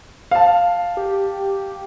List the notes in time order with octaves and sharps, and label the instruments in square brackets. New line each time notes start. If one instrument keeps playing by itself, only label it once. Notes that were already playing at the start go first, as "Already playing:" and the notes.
[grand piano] F5 A5
[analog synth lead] G4